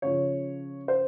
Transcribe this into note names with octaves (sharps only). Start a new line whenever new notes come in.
C#3 F3 C#5
C5